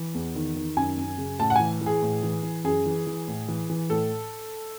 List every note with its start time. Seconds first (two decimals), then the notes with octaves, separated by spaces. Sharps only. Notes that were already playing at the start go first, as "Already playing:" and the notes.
Already playing: E3
0.15 E2
0.35 D#3
0.56 D#3
0.77 F#2 G#5
0.97 F#2
1.18 C#3
1.40 A2 A5
1.50 F#5
1.56 E3 G#5
1.81 E3
1.86 G#4
2.02 A2
2.23 E3
2.43 E3
2.64 F#2 G#4
2.86 E3
3.07 E3
3.28 A2
3.48 E3
3.70 E3
3.90 A2 A4